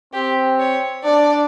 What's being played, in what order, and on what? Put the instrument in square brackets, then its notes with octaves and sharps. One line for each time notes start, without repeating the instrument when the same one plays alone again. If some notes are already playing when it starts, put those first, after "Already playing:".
[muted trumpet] C4 [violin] G4
[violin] C#5
[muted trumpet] D4 [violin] D5